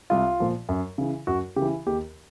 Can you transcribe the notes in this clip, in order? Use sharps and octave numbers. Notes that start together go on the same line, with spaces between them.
C2 F4
A#2 F3
F#2
C#3 E3
F#2 F#4
C#3 G4
E3
D#2 G4